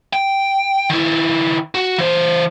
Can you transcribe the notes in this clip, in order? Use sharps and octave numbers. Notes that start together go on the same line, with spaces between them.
G5
D#3 E4
F#4
E3 C5